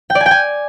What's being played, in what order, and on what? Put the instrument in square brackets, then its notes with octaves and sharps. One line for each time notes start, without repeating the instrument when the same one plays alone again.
[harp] G5
D5
G#5
G5
G#5